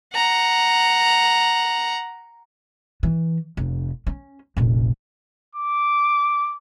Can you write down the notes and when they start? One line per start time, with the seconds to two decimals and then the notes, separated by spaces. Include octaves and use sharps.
0.14 F#5 A#5
3.03 E3
3.57 F1
4.07 C#4
4.57 F1 A#1
5.55 D6